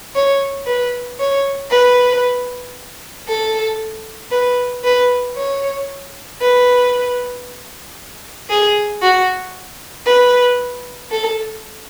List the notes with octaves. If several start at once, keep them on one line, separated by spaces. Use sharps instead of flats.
C#5
B4
C#5
B4
A4
B4
B4
C#5
B4
G#4
F#4
B4
A4